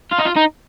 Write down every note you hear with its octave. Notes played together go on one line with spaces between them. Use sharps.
F4
D#4
F4
D#4